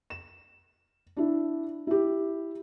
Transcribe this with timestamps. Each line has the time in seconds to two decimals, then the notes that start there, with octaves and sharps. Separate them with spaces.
0.10 E7
1.17 D4 E4
1.87 E4 G4